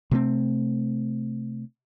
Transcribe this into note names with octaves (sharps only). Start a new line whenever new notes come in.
C3 A3 C4